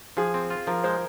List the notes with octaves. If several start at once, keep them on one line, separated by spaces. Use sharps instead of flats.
F3 G#4
C4
F4
F3 A#4
G#3 C5